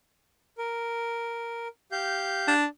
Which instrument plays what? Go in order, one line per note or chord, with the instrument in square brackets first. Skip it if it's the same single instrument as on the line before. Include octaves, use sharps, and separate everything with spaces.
[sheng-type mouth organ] A#4
G4 F5 G6
[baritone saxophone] D4